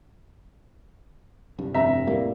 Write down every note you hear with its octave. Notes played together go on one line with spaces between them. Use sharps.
C2 G2
F1 E5 A#5
A2 G3 A#3